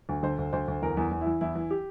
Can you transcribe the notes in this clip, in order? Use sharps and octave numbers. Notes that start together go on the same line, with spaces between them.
D2
D3 C5
D2
D2 C5
D2
E2 A#4
E2
E2
E4
E3
E2 E4
E3
G4